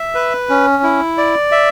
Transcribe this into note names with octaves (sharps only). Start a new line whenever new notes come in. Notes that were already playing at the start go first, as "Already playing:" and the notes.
Already playing: E5
B4
C#4
E4
D5
E5